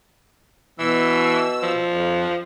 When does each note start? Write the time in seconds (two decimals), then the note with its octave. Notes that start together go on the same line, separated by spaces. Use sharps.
0.79 B2 E3 E6
1.62 F3
1.90 F2